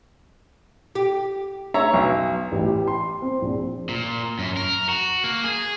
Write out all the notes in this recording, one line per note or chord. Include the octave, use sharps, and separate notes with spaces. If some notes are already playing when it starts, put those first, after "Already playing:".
G4
C#5 E5 A#5
B1
A1
G4
C6
C4
A#1
A#2
F#2
A#4
F#4
A#3
G#4